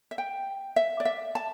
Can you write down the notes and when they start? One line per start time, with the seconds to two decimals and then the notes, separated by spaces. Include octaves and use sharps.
0.11 E5
0.18 G5
0.76 E5
1.00 D5
1.05 E5
1.35 A5